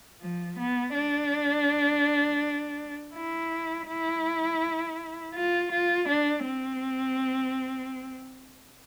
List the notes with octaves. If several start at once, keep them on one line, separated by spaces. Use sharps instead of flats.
F3
B3
D4
E4
E4
F4
F4
D4
C4